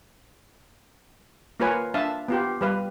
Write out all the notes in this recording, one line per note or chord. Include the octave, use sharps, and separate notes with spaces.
A#3 F4 A#4 B4 C#5 G#5
D4 E5 F5 A5
B3 F4 G4
G3 B4 F5